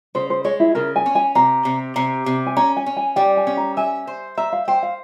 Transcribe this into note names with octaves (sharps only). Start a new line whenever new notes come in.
C#3 C5
C5
G#3 C#5
E4
C#3 A#4
G#5
C#4
G#5
C3 A#5
C3
C3 A#5
C3
G#5
C#4 A#5
G#5
C#4
G#5
G3 G5
G#5
C#4
A#5
E5 G#5
C5
E5 A#5
F5
C5 G5
F5